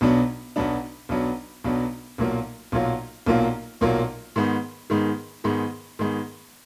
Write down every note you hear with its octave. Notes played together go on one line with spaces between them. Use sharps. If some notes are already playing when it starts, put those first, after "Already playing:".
B1 B2 F#3 B3 D4
B1 B2 F#3 B3 D4
B1 B2 F#3 B3 D4
B1 B2 F#3 B3 D4
B1 A#2 F#3 A#3 F4
B1 A#2 F#3 A#3 F4
B1 A#2 F#3 A#3 F4
B1 A#2 F#3 A#3 F4
G#2 D#3 G#3 B3
G#2 D#3 G#3 B3
G#2 D#3 G#3 B3
G#2 D#3 G#3 B3